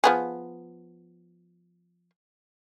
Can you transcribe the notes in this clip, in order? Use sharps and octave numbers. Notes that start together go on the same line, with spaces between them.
F3 B3 G#4